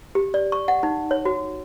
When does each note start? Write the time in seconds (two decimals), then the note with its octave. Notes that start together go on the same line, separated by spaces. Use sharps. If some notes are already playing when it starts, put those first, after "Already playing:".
0.15 G4
0.34 D5
0.52 C#6
0.68 F#5
0.83 D#4
1.11 C#5
1.25 F#4